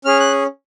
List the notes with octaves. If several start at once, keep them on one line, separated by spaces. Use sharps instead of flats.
C#4 G#4 F6
F#6